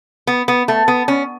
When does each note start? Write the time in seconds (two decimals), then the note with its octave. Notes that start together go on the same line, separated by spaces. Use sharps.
0.27 B3
0.48 B3
0.68 A3
0.88 B3
1.08 C#4